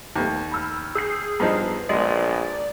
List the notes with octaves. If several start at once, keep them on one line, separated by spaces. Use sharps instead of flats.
D#2 A3 B3 G4
B5 E6 F6
G#4 E6 G6 C7
G2 F3 B3 D#4
A#1 G#3 D5